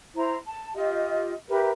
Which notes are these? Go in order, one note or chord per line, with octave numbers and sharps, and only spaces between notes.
E4 C5 A#5
A5
F4 G4 D#5
G4 A#4 B4 E5